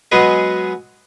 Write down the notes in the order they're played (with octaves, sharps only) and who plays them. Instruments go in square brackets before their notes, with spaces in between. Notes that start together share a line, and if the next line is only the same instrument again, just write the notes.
[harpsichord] F#3 G#3 B3 G#4 B4 D#5